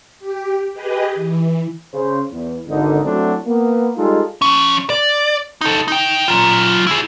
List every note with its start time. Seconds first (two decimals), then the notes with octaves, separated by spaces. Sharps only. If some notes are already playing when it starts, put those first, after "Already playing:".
0.20 G4
0.74 G4 G#4 B4 D#5
1.15 E3
1.94 C#3 C5
2.32 E2
2.67 G#1 D3 D#4
3.04 F#3 A3 C4 D4 E4 F#4
3.46 A#3 B3
3.96 G3 G#3 D#4 F4 G#4 A4
4.42 F3 C#4
4.90 D5
5.61 D#4 A4
5.88 D#4 G5
6.28 F#3 F4
6.87 E4 G#4